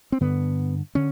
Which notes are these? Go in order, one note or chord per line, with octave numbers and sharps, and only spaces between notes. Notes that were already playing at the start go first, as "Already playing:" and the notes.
C4
G2 D3 B3
D3 C#4